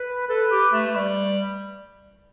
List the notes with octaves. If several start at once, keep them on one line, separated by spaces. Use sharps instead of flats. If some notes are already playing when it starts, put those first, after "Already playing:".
Already playing: B4
A4 B4
G4
A3
A3
G3